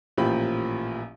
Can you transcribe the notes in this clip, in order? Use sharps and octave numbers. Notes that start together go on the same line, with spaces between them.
A1 A#2 F3 G4 B5